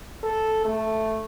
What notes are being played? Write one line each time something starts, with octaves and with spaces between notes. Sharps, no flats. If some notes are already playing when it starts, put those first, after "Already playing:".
A4
A3